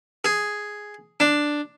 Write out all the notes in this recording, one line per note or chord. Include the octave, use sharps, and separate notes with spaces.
G#4
D4